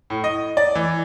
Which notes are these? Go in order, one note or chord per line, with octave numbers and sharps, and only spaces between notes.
A2
D#5
D5
E3